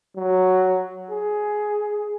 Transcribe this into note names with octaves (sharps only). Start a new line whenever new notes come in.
F#3
G#4